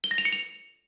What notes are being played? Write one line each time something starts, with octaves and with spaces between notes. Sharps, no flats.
G7
A#6
F7
C#7
F7